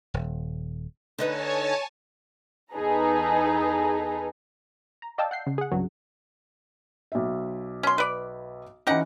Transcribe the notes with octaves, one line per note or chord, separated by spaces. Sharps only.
D#1
D3 D#4 B4 C#5 G#5 A5
E2 D#4 G#4 A4 B4 A#5
A#5
D5 D#5 F5 G5 A5 E6
F#5 G6 C7
C#3
G#4 F#5
C2 G2 C#3 F#3
B1 E5
C#4 C6
B4 D5
E3 C#4 D#4 G4 F#5